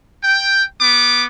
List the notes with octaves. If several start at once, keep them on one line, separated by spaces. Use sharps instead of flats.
G5
B3 D6